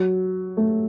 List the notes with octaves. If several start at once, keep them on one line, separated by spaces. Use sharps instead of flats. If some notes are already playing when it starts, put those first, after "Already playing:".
Already playing: F#3
A3